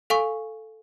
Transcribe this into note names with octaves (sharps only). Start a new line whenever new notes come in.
A4 F5 G#5 C#6